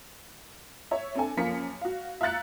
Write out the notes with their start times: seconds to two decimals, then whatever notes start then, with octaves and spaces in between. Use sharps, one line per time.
0.91 C#5 E5
1.15 C4 D4 A4 G#5
1.37 F#2 F3 A#3 F4 B6 C#7
1.81 F#4 F5
2.21 E5 F5 A#5 F#6 A6 C#7